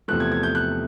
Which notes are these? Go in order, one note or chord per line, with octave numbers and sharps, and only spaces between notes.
E2 C3 F3 A3 F#6
G#6
G#6
G6
F#6